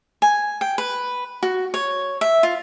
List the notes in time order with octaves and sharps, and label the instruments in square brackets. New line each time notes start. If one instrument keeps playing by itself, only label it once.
[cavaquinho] G#5
G5
B4
F#4
C#5
E5
F4